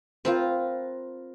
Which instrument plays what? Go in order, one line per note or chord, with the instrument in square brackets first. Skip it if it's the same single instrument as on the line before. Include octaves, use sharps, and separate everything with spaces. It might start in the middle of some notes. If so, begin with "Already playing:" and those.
[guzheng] C4 [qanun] F4 A#4 B4